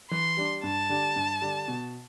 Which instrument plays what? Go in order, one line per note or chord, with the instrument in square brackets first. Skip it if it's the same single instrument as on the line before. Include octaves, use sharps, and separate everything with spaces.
[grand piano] E3 [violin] C6
[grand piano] G3 D4
[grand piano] G2 [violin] A5
[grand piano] D3 G3 D4
G2
D3 G3 D4
B2